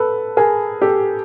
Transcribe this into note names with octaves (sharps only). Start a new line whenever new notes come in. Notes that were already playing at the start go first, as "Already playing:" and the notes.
Already playing: A4 B4
G#4 A#4
G4 A4